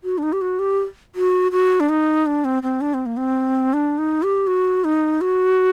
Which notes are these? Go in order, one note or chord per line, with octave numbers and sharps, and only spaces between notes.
F#4
D4
D#4
G4
F#4
G4
F#4
F#4
D4
D#4
D4
C4
C4
D4
C4
A#3
C4
D4
D#4
G4
F#4
D#4
F#4